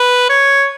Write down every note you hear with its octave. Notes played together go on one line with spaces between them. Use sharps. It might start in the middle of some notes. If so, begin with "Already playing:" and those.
Already playing: B4
C#5